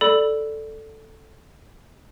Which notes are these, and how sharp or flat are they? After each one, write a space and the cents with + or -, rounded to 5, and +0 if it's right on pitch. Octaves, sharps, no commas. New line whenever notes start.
A4 +0 D5 +0 B5 +0